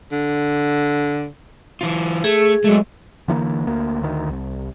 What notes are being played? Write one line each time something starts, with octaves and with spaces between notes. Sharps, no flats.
D3
E3 F4
A3 G#4
F#3 G#3 A3
D3 E3 G#3 A#3
D2 A#3
D2 D#3
C2